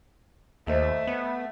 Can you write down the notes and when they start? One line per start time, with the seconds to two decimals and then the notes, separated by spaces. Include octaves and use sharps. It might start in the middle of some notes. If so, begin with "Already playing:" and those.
0.67 D#2 A3 C5 D#5 E5
1.07 B3